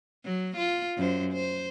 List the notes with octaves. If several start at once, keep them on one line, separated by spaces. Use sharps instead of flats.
F#3
F4
F#2 C5
C5